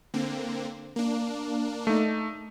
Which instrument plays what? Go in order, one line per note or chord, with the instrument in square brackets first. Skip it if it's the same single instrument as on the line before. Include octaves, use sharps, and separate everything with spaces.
[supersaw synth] D3 A#3 C4
A#3 D4
[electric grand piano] A3 D#4